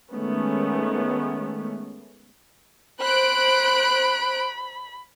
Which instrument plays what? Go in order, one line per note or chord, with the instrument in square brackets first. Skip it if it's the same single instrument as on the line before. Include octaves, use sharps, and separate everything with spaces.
[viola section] D#3 G#3 A3 B3 C#4
[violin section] C5 F#6 D7 [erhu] B5